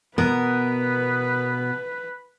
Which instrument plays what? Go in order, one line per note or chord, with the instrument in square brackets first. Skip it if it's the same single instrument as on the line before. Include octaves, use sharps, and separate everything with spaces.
[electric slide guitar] B2 B3 [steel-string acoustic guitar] A#4 [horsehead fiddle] B4